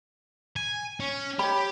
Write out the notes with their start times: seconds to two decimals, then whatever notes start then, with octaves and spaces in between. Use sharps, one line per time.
0.56 G#5
1.00 C#4
1.39 G4 C#5 B5